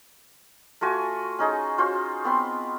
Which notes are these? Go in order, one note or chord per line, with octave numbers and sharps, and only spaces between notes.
A3 F4 F#4 G#5
C#4 D#4 G#4
C#4 F4 F#4 C5
B3 C4 B4 C6